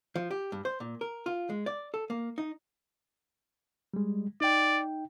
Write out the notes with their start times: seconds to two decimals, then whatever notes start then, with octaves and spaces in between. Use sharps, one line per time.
0.16 F3
0.31 G4
0.52 G2
0.65 C5
0.80 A#2
1.01 A#4
1.26 F4
1.50 G#3
1.66 D5
1.94 A4
2.10 A#3
2.38 D#4
3.94 G3 G#3
4.41 D#4 D5 G5